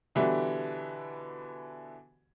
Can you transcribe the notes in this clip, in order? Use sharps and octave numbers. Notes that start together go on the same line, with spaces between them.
B2 D3 E3 G3 E4 F#4